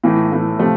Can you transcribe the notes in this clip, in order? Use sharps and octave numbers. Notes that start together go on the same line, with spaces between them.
A2 E3 A3
A2 E3 A3
C3 F3 A3